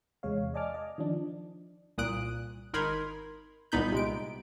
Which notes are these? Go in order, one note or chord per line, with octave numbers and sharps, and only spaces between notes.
E2 C3 G#3 C#5 F5
D5 D#5 G#5 A5 D6 F6
D#5
D#3 F3 D4
C2 A#2 D#6 F#6 D7
G#1 D#4 A#4 B5 C6 G#6
C2 A#2 B3 D#4 B5 G6
C3 G#3 D7